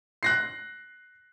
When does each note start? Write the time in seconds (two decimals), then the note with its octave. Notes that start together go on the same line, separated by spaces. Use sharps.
0.23 F#6 A#6 C7